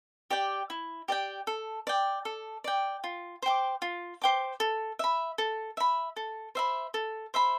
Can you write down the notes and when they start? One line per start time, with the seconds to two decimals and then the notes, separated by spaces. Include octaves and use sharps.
0.30 G4 D5 G5
0.70 E4
1.08 G4 D5 G5
1.47 A4
1.87 D5 G5
2.25 A4
2.64 D5 G5
3.04 F4
3.42 C5 G5 D6
3.82 F4
4.22 C5 G5 D6
4.60 A4
4.99 E5 B5
5.38 A4
5.77 E5 B5
6.16 A4
6.55 C5 E5 B5
6.94 A4
7.34 C5 E5 B5